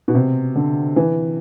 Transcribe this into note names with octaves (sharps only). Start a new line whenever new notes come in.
B2
C3
D3
E3